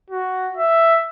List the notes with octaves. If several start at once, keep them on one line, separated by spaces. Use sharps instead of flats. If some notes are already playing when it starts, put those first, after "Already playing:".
F#4
E5